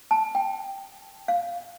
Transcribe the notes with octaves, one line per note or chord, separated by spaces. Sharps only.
A5
G5
F5